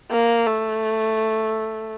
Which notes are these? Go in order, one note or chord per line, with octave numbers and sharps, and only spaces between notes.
A#3
A3